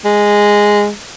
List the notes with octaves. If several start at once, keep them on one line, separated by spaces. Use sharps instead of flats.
G#3